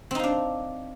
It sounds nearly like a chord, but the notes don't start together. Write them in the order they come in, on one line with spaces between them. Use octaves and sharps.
C4 D#4 F5 D4